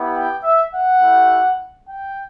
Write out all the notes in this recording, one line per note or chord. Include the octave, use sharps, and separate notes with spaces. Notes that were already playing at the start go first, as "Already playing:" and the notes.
Already playing: B3 E4 G4
G5
E5
F#5
A3 E4 G4
G5